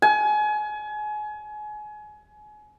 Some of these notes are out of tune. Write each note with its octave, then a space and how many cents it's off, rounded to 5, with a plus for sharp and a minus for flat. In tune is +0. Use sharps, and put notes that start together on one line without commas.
G#5 +30